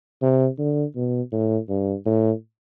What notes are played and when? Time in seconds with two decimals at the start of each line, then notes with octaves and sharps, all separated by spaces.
0.22 C3
0.58 D3
0.95 B2
1.32 A2
1.69 G2
2.06 A2